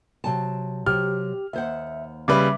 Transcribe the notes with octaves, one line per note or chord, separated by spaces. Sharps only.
C3 F#3 A5
C3 F#3 G4 F6
D#2 C5 E5 F#5
C#3 G3 B4 E5 D6